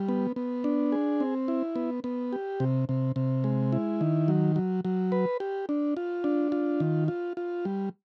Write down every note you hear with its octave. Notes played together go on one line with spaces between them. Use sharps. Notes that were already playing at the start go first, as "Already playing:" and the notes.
Already playing: G3
B3
B3
D4
G#4
C4
E4
B3
B3
G4
C3
C3
C3
G#3
E4
D#3
F#3
F#3
F#3
B4
G4
D4
F4
D4
F4
D#3
F4
F4
G3